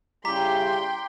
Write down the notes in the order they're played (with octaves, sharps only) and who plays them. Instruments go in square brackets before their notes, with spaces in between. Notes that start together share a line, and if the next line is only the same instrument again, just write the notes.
[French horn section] C#3 G3 E4 [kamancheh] G5 C6 [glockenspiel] A#5 B6 [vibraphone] D6